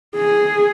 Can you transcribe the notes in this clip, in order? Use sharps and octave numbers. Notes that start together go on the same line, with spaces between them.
G#4